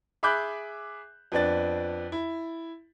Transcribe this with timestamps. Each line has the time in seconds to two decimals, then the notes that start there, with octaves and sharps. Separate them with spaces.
0.23 G#4 E5 B5 D6 F#6 G6
1.32 F2 B3 D4 A6
2.12 E4